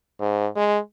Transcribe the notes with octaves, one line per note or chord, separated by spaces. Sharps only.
G#2
G#3